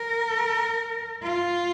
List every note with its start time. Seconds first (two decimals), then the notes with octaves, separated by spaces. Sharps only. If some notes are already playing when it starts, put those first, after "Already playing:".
Already playing: A#4
1.24 F4